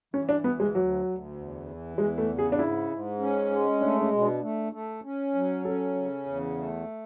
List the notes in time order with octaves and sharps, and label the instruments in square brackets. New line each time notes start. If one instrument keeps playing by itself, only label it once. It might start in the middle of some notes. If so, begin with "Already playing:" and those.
[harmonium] E3 [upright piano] C#4
[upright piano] D4
[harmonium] D2 [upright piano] B3
[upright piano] G#3
[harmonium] D2 [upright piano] F#3
[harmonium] D2
E2
E3
[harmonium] E2 [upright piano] G#3
[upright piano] A3
[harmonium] C#3
[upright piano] G#4
D4
[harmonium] G#2 [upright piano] E4
[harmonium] G#2
C#4
G#3
[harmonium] A3 [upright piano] D4
[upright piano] C#4
[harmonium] B2
[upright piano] D4
[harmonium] A3
A3
C#4
F#3
[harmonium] C#4 [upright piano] A4
[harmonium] C#3
E2
A3